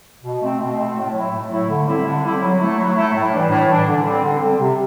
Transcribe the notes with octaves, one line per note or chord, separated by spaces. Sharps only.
B2
A3 C4
B2
A3 C4
A2
F#3 A3 E4
A2
F#3 A3 E4
D3
G3 C4 E4
D3
G3 C4 E4
F#3
A3 E4
F#3
A3 E4
A2
E3 G3 D4
A2
E3 G3 D4
D3
G3 C4
D3
G3 C4
C3